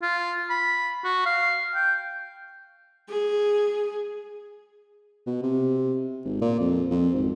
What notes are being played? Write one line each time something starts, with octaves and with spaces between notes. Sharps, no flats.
F4
B5
F#4
F5
G5
G#4
B2
C3
G#1
A#2
F2
F2
G#1